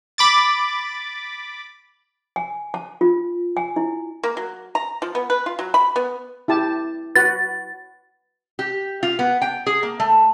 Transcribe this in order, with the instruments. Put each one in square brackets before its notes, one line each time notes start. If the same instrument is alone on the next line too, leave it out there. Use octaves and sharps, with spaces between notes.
[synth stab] B5 D6 A6
[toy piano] G#5
A5
F4
G#5
E4
[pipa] A#3
F#3
A#5
F3
B3
B4
F4
F#3
B5
B3
[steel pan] E4 G4 A5
[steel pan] F#4 B4 [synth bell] A6
[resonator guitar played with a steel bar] G4
F4
B3
G5
G#4
A#3
A3